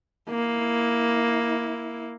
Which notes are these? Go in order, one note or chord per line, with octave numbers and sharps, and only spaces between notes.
A#3 E4